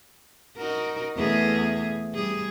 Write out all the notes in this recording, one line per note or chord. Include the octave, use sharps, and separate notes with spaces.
D#4 F#4 A#4
E2 A3 G#4
G3 G#4